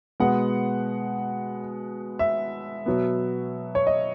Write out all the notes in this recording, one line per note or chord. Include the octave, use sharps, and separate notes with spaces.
B2 G#3 B3 F#5
E5
B2 F#3 B3
C#5
D#5